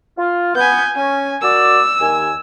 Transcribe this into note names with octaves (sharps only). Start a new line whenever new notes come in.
F4
B3 G#5 G6
C#4 G#5
F#4 A#4 D5 E6
D#2 G#5